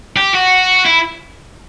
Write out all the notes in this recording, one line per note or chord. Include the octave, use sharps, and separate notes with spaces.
G4
F#4
E4